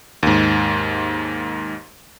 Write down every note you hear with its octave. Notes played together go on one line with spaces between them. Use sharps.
D#2 G#2